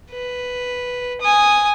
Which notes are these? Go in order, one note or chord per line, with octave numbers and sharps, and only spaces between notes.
B4
G#5 D#6